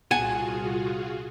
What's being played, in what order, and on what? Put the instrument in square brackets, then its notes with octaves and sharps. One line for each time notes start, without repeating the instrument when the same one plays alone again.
[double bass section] C2 A#2 [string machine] F4 F#4 G#4 [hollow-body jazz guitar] F#5 G#5 A5